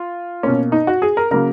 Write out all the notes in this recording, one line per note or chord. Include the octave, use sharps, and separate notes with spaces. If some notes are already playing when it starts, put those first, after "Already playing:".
Already playing: F4
B2 A#3 C#4
D#4
F#4
G#4
A#4
C#3 F#3 A#3 A#4